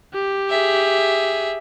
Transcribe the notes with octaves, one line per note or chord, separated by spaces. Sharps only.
G4
G#4 E5